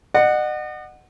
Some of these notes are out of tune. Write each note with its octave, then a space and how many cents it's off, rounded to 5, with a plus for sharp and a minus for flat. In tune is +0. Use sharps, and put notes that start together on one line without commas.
D#5 -40 F#5 +0